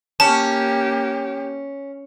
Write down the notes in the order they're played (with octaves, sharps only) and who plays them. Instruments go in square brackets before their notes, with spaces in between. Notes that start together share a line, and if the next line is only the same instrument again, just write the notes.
[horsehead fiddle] A#3 G4 [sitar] C#4 [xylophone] A5